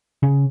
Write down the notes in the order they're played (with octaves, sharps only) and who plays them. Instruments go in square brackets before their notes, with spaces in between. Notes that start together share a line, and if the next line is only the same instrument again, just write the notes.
[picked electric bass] C#3